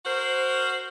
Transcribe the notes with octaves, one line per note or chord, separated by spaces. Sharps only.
F#4 A#4 C5